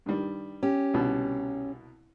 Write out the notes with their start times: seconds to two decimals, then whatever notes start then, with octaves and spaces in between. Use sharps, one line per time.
0.06 G2 D#3 G3
0.63 C#4 G4
0.94 C2 B2 D3